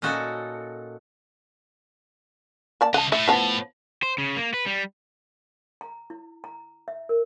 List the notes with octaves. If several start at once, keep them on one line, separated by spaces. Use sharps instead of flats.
A#2 C#4 D#4 F#4 A4
A#3 D5 A5
C#3 D#5 F#5 A5
A2 E5
F3 B3 A5
C5
C#3
A#3
B4
G3
A#5
E4
A#5
E5
A#4